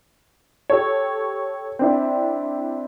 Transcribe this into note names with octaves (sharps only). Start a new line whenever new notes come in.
G4 A4 C#5
C4 D4 E4